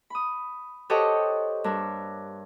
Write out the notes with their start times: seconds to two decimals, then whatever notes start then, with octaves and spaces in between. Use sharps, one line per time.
0.10 B5 D#6
0.90 G4 A4 C5 C#5 D#5 F#5
1.64 G2 A#4 E6